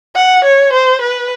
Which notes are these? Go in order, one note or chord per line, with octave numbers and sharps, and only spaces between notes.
F#5
C#5
C5
B4